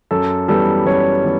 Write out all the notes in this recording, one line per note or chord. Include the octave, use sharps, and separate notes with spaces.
F#2 A4
E3 G3 B3 A4
F#2 C#5
E3 B3